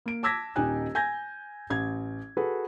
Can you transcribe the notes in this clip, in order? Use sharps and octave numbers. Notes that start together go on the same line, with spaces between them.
A#3 D7
A5 D6 E6 G#6 A#6 B6
D#1 D#4 G4 D#5 G#5 F#6
G#5 G6 G#6 A#6
A1 G#6
F#4 G#4 A4 B4